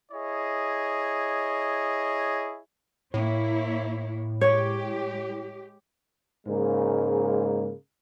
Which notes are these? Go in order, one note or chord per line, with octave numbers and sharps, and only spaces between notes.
E4 G#4 C#5 D#5
A2 A#3 E4 C#5
G#3 G4 C#5
G#2 C#3 G#3 A#3